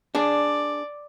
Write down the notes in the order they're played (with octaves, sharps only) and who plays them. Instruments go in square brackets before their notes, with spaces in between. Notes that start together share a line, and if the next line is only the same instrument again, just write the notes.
[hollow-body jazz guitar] D4 G#4 [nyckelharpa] D5